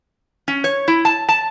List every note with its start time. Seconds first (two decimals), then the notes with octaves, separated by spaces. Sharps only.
0.48 C#4
0.64 C#5
0.88 E4
1.05 A5
1.29 A5